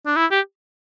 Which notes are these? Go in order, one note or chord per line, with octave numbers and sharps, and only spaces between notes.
D4
E4
G4